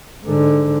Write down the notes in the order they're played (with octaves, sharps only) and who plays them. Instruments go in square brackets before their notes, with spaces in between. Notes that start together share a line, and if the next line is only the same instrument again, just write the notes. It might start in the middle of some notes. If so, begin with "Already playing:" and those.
[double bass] G#2 D3